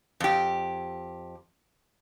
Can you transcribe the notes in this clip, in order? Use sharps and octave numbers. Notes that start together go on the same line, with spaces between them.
F2 G4